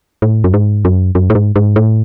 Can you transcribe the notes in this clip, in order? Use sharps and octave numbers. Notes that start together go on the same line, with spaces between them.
A2
F#2
G#2
F#2
F#2
A2
G#2
G#2
A2